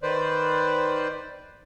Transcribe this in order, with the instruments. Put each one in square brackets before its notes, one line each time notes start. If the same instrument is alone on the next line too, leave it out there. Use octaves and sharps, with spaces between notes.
[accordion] D#3 B4 C5 D5